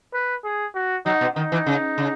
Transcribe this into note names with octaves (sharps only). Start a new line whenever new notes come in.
B4
G#4
F#4
F#3 D#4
B2
D#3 D#4
E3
C#3
C#3